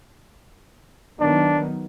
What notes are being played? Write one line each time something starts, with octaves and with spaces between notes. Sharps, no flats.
D#3 F#3 B3 D4